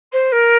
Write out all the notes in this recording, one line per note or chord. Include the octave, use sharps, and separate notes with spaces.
C5
A#4